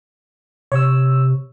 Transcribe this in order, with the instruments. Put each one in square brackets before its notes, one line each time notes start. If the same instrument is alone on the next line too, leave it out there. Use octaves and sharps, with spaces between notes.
[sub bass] C3 [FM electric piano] C#5 E6